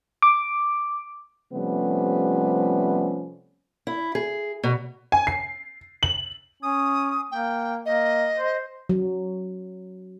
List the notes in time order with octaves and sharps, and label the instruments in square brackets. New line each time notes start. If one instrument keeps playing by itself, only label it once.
[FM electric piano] D6
[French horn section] C3 F3 G3 A3 B3 C#4
[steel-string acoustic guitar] E4
G#4
B2
[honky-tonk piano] G#5
C7
F#7
[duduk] C#4 [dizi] D#6
[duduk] A#3 [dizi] G5
[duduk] A#3 [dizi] D#5
[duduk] C5
[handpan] F#3